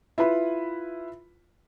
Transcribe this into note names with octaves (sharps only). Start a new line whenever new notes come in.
E4 F4 B4 B5